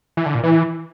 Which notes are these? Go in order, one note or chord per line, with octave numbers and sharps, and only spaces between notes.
E3
D3
A#2
E3